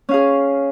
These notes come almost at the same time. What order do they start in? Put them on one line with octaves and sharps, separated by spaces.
C#4 F5 G#4